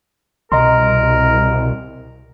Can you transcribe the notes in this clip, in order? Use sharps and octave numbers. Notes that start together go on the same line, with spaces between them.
C2 B2 A#4 D#5 A#5 C6